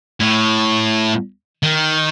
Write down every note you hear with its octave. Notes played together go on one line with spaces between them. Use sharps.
A2
D#3